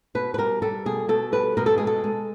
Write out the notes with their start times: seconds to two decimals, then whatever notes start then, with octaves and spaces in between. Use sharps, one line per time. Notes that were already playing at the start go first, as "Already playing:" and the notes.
0.15 B2 B4
0.34 B4
0.38 G3 A#4
0.62 G3 A4
0.86 B2 G#4
1.09 B2 A4
1.32 G3 B4
1.57 B2 A#4
1.66 A4
1.78 G#3 G#4
1.87 A4
2.04 G#3